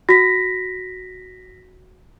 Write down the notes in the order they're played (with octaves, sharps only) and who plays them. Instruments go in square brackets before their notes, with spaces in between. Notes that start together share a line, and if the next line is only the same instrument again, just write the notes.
[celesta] F#4 [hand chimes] A#6 B6